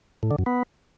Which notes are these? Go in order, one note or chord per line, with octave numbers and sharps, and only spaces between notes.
A2
D3
F#2
B3